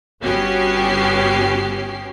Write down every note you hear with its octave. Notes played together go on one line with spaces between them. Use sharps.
G1 B3 C#4 F#4 G4 C7